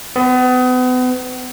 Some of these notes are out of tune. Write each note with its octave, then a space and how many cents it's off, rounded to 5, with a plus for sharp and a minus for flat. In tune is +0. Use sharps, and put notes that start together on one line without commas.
B3 +35